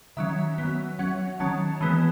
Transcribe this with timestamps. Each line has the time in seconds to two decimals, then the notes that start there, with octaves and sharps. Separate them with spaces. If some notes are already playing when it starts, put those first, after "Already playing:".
0.17 D#3 F#3 C#4 E5
0.58 F#3 B3
0.99 F#3 C#4 F#5
1.40 D#3 F#3 C#4 A5
1.81 E3 G#3 B3